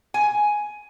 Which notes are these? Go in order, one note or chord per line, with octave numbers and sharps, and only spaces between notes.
G#5